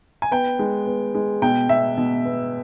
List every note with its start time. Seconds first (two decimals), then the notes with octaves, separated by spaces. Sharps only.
0.22 G#5
0.31 B3 G5
0.59 G#3
0.86 B3
1.14 G#3
1.42 B2 G5
1.69 B2 E5
1.97 B2
2.25 B3